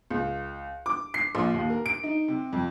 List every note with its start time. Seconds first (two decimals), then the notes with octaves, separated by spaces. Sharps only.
0.11 C#2
0.86 D6
1.14 C7
1.35 A#1
1.54 D#2
1.70 A#4
1.86 D7
2.03 D#4
2.28 C3
2.53 F2